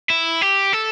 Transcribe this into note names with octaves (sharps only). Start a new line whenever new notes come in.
E4
G4
A4